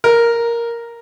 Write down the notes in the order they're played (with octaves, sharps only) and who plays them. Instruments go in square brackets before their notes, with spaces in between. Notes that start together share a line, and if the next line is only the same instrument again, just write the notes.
[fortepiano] A#4